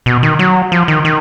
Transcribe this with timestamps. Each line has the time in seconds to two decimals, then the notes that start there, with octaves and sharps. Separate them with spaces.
0.06 B2
0.23 D#3
0.39 F#3
0.72 F3
0.88 D#3
1.05 D#3